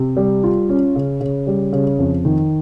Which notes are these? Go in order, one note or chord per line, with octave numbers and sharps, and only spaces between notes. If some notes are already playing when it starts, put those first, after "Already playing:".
Already playing: C3
G3
F4
C#4
C#3
C#3
G3
C#3
F2
D#3